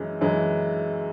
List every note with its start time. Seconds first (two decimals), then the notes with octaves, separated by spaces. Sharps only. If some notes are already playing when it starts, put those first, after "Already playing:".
Already playing: F#2 E3 G#3
0.21 F#2 E3 G#3